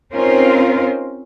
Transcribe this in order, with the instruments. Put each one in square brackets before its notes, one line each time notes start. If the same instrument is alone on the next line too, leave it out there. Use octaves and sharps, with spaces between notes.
[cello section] C4 C#4 D#4 F4 A#4 C5